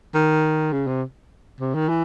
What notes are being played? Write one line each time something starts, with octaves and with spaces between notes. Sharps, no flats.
D#3
C#3
C3
C3
D#3
E3